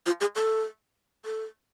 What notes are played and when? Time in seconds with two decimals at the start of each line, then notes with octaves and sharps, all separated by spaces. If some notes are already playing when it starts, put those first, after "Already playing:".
0.06 F4
0.21 G#4
0.36 A4
1.25 A4